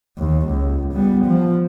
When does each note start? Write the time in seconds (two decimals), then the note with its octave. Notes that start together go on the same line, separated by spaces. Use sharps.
0.18 D#2
0.47 C#2
0.93 G3 B3
1.25 F3